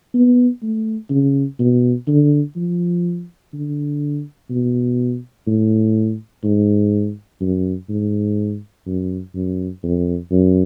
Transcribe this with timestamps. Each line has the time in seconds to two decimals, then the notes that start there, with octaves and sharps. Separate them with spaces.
0.14 B3
0.63 A3
1.10 C#3
1.59 B2
2.08 D3
2.56 F3
3.53 D3
4.50 B2
5.47 A2
6.44 G#2
7.41 F#2
7.89 G#2
8.87 F#2
9.35 F#2
9.83 F2
10.31 F#2